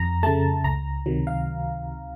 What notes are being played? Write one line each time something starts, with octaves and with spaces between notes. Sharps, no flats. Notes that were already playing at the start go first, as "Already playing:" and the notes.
Already playing: F2 A#5
C#3 A3 A5
C#2 A#5
C3 D#3 F#3
F5